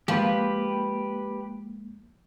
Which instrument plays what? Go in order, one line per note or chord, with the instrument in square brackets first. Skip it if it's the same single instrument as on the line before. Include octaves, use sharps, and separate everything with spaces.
[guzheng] F3 [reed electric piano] G#3 A#3 [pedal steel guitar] G4 B4